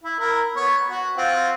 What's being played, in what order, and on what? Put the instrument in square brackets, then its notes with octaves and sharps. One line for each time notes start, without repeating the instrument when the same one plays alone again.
[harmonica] E4
E4 A#4
B3 C#5
F#4
C4 F4 F#5